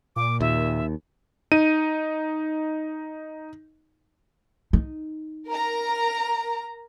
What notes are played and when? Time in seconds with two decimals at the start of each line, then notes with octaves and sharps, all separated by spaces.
0.16 A#2 D6
0.41 D#2 E5
1.52 D#4 D#7
4.73 D#4
5.48 A#4 A#5